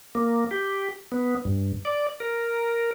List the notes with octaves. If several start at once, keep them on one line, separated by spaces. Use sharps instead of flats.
A#3
G4
B3
G2
D5
A#4